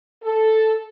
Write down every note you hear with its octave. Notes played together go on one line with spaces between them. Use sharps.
A4